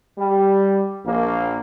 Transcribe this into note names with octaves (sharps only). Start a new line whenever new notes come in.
G3
A#1 A#3